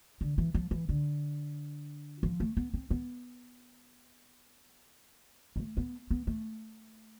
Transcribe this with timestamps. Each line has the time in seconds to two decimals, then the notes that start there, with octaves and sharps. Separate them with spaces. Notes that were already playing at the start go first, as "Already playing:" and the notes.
0.21 D3
0.38 E3
0.55 F3
0.71 E3
0.89 D3
2.23 F3
2.40 A3
2.57 B3
2.74 C4
2.91 B3
5.56 G3
5.60 A3
5.77 B3
6.11 B3
6.27 A3